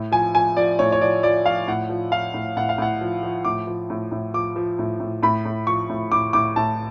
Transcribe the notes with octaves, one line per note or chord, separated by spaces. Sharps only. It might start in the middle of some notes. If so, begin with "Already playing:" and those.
Already playing: A2
F3 G#5
F3 G#5
F3 D5
A2 C#5
C#5
F3 D5
F3 D5
F3 F5
A2 F#5
F3
F3 F5
A2
A2 F#5
F5
A2 F#5
F3
F3
A2 D6
F3
A2
A2
F3 D6
F3
A2
A2
A2 B5
A2
F3 C#6
A2
A2 D6
A2 D6
A2 A5